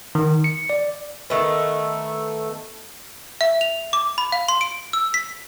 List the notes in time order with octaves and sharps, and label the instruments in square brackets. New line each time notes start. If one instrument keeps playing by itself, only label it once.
[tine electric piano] D#3
C#7
D5
[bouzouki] D#3 A3 B3
[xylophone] E5
F7
D6
B5
F5
C6
D7
E6
B6